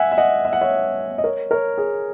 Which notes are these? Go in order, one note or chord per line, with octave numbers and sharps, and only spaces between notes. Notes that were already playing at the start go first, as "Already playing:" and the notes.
Already playing: E5 F#5 G#5
E5
D#5 F#5
E5
F#5
C#5 E5
D#5
A#4 C#5
A#4 C#5
G#4